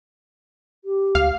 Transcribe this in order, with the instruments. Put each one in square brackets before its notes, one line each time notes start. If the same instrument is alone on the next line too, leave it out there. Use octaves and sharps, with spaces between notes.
[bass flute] G4
[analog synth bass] D2 [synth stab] F5